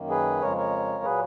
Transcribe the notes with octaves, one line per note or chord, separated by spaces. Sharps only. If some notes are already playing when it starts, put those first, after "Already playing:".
Already playing: F#2 D#3 A#3
G#4 B4
F2 C#3 G#3 A#4 C#5
A#4 C#5
A#2 F#3 A#3 G#4 B4